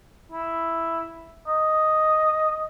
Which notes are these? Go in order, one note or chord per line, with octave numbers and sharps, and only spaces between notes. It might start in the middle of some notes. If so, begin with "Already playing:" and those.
E4
D#5